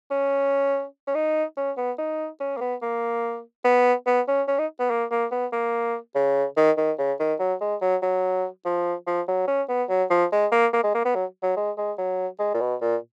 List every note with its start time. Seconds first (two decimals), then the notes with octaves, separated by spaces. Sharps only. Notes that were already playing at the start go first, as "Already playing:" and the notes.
0.11 C#4
1.07 C#4
1.15 D#4
1.57 C#4
1.77 B3
1.98 D#4
2.40 C#4
2.57 A#3
2.61 B3
2.82 A#3
3.64 B3
4.06 B3
4.28 C#4
4.48 C#4
4.59 D#4
4.80 B3
4.90 A#3
5.11 A#3
5.32 B3
5.52 A#3
6.15 C#3
6.57 D#3
6.77 D#3
6.98 C#3
7.20 D#3
7.39 F#3
7.61 G#3
7.81 F#3
8.02 F#3
8.65 F3
9.07 F3
9.28 F#3
9.48 C#4
9.69 B3
9.89 F#3
10.10 F3
10.32 G#3
10.52 A#3
10.73 A#3
10.83 G#3
10.94 A#3
11.05 B3
11.15 F#3
11.43 F#3
11.57 G#3
11.78 G#3
11.98 F#3
12.39 G#3
12.54 A#2
12.60 B2
12.81 A#2